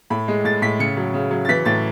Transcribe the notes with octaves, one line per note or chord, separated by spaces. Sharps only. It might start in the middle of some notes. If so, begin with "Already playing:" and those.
A2 B5
G#3
A2 A6
A2 B6
C#3 C#7
F#3
C#3
F#3
A6
E3 B6
A2 A6